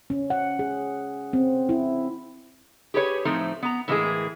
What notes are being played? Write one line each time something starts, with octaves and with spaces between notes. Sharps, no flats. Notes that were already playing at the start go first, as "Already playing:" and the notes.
C#4
F#5
G#4
C4
E4
G4 G#4 B4 C#5
A2 F3 A3 C4 D#4
B3 A#5
A2 E3 G#3 A#3 E4 G#4